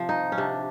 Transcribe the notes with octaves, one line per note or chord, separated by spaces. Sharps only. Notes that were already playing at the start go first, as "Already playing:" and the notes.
Already playing: C3 F3
D#4
C#4
C3 D4